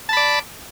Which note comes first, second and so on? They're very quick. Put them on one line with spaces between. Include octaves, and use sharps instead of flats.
A5 B5 D5